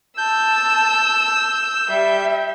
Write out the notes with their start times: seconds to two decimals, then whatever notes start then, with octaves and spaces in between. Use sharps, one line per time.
0.18 A5 E6 G6
1.89 G3 E5